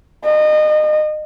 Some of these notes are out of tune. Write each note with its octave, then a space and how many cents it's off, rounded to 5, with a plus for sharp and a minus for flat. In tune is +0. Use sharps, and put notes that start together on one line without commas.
D#5 -30